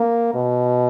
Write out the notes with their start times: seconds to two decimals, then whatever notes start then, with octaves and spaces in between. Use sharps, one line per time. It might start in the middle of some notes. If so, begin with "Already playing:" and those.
Already playing: A#3
0.35 B2